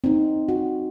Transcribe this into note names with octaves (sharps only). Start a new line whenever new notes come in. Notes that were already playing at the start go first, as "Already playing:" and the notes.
C4 D#4
F#4